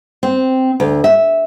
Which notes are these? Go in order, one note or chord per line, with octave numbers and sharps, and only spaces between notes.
C4
D2
E5